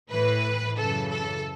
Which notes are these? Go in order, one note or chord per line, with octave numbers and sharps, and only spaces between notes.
A2 E3 B4
F#2 C#3 E3 A4
A4